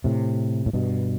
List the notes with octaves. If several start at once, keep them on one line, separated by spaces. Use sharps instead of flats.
A2 C3
A2
G2 B2